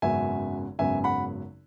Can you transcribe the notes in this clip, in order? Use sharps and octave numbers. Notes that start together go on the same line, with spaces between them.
G#1 F#2 C#3 F#3 B3 E5 G#5
G#1 F#2 C#3 F#3 B3 E5 G#5
F#5 B5